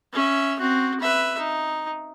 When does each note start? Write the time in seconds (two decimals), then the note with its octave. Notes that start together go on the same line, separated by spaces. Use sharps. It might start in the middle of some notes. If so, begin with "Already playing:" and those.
0.13 C#4 E5
0.59 C4 F#4
1.00 B4 E5
1.38 D#4